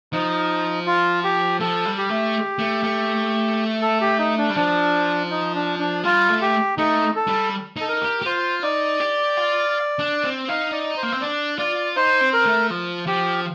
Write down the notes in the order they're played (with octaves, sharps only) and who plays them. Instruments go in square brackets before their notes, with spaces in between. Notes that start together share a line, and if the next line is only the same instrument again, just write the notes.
[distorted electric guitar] F3 [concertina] D#4
[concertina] F4
G4
[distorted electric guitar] F3 [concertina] A4
[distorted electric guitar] G3
[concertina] G4
[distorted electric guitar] A3
A3
A3
[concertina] A4
G4
D#4
D4
[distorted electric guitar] G3
[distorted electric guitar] F3 [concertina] D4
[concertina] D#4
D4
D4
[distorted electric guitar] G3 [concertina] F4
[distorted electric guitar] A3
[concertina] G4
[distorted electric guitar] A3 [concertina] D#4
[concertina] A4
[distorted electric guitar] G3
[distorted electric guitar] D#4 [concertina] A4
[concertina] A#4
[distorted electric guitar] G4
G4
[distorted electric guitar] F4 [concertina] C5
[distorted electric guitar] D#4 [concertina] D5
[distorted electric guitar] G4
F4
D4
C4
[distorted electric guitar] D#4 [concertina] F5
[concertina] D5
C5
[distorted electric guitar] A#3
C4
[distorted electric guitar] D4 [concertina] D5
[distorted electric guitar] F4 [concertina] D5
[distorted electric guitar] D#4 [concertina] C5
[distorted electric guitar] C4
[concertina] A#4
[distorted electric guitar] A3
F3
[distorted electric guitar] F3 [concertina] G4